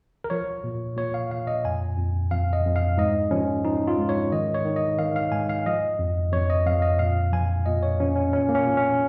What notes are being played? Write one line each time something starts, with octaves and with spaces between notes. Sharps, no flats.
A#4
F3 C#5
A#2
A#2 C#5
F5
A#2 F5
D#5
F2 G#5
F2
F2 F5
D#5
F2
F5
G#2 D#5
F3 C#4
F3 D#4
F4
G#2
C#5
D#3 D#5
C#5
D#3
D#5
D#3 F5
F5
G#2 G#5
F5
F3 D#5
F2
F2 C#5
D#5
F2 F5
D#5
A#2 F5
F3 G#5
A#2 D#5
C#5
F3 C#4
C#4
A#2 C#4
A#3
C#4
A#2
C#4